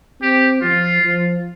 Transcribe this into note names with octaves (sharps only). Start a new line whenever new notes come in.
C4 G4
F3 F4
F3